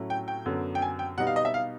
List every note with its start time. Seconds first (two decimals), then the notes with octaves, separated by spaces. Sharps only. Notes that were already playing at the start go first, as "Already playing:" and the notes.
Already playing: A2 F#3 A3 C#4 E4
0.10 G5
0.28 G5
0.45 F#2 D3 F#3 B3
0.75 G5
0.82 G#5
0.99 G5
1.17 B2 G3 B3 D#4 F#5
1.27 F5
1.36 D#5
1.45 E5
1.54 F5